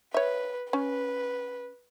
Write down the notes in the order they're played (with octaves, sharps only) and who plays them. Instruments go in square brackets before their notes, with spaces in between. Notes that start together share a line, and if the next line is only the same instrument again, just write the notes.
[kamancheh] B4 [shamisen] C#5 E5
[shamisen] C#4 [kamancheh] B4